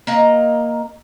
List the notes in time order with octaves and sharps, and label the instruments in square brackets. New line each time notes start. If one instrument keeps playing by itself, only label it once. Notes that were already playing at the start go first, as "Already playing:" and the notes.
[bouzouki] A#3 D#5 A#5